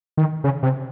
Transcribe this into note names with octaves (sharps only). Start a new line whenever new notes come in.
D#3
C#3
C3